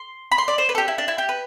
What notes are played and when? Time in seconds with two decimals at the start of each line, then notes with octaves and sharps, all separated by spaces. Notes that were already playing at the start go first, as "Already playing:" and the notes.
Already playing: C6
0.32 B5
0.38 C6
0.48 D5
0.58 C5
0.69 B4
0.75 A4
0.78 G4
0.88 E4
0.98 D4
1.08 E4
1.18 G4
1.29 B4